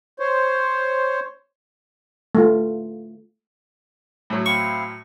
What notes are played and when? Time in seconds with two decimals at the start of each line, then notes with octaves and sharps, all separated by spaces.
0.20 C5 C#5
2.35 A3 F4
4.30 A2 F#3
4.46 C4 E4 F5 C#6